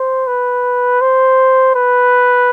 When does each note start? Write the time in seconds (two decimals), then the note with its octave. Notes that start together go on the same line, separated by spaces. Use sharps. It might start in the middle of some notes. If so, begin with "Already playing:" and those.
Already playing: C5
0.27 B4
1.01 C5
1.75 B4